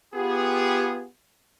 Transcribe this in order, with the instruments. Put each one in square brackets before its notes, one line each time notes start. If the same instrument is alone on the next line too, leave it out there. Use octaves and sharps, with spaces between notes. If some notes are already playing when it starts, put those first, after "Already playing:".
[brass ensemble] B3 F4 G4 G#4